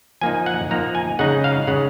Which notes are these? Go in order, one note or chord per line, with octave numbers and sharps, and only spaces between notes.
F3 A#3 D#4 G#5
F#5
F3 A#3 D#4 A#5
G#5
C#3 G#3 D#4 F#5
F5
C#3 G#3 D#4 F#5